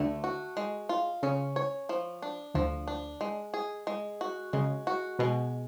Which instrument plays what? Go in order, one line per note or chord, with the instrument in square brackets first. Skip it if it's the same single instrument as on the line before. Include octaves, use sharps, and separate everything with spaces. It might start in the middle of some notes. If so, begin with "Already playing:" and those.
Already playing: [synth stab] D2 D3 [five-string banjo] A3
[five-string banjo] F#4
G#3
F4
[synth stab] C#3 [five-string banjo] C#4
[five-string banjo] C#5
F3
D4
[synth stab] D2 D3 [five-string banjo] F3
[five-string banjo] D4
G#3
G#4
G#3
F#4
[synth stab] C#3 [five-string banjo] G#3
[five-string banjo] F#4
[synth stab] B2 [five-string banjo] G#3